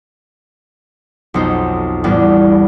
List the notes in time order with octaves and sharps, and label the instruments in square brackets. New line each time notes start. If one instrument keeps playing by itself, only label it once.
[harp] B1 F2 D#4 C5
E2 A2 G3 B3 D4